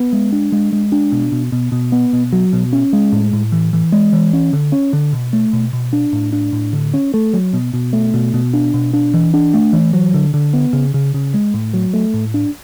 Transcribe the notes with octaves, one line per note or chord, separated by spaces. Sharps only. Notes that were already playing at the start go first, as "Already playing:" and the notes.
Already playing: B3
G#3
D4
G#3
G#3
D4
B2
B2
B2
B2
B3
B2
F#3
B2
C#4
G#3
A2
A2
E3
E3
G#3
E3
C#4
D3
C#4
D3
B2
A3
B2
B2
D4
A2
D4
A2
D3
C#4
A3
F#3
B2
B2
A3
B2
B2
D4
B2
D4
E3
D4
A3
E3
F#3
D3
D3
B3
C#3
C#3
C#3
G#3
A2
F#3
A3
A2
D4